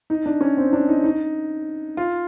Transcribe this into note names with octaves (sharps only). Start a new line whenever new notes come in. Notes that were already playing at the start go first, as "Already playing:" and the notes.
D#4
D4
C#4
C4
D4
D#4
D#4
F4